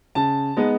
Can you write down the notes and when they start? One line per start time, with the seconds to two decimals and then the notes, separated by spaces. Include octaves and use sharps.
0.15 C#3 A5
0.57 G#3 B3 D#4